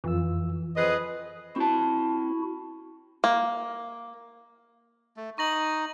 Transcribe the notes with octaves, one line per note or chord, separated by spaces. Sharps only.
F2 E3 F4 E6
F2 G#4 B4 C5 D#5
C4 E4 F#4 A5
A#3
A3
D#4 C#6 A#6 F#7